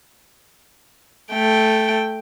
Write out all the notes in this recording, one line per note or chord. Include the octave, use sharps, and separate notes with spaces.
A3 G5